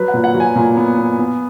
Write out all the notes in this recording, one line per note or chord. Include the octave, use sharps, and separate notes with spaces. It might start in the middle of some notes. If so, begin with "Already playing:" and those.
Already playing: F#3 B4
F#5
A#2
F#5
F#3
G#5
A#2
B3
B3
B3